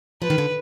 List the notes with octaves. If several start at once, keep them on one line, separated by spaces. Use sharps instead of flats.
F3 B4
D#3
D3